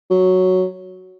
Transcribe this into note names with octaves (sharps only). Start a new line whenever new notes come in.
F#3